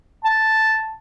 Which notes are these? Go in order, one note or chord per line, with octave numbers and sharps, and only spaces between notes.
A5